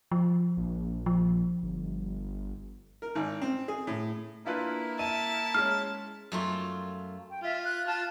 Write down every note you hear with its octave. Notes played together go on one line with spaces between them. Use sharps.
F3
A#1
F3
G1
A#4
G#1
C4
G#4
A2
A#3 D4 E4 F4 B4
E5 A5 D#7
G#3 C#4 F6
F#2 A3 F4
G5
F4 E5
F#6
F4 A5